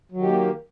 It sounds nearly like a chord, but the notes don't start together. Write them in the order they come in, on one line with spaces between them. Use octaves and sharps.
F#3 D#3 G4 A#3